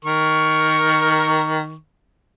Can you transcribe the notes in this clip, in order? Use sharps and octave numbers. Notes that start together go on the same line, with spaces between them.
D#3 A#4 C#6